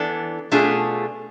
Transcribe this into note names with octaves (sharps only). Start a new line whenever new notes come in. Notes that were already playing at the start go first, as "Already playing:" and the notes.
Already playing: E3 B3 D4 A4
B2 A3 D4 F4 G#4